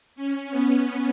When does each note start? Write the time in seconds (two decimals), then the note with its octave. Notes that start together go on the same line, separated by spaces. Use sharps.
0.16 C#4
0.50 B3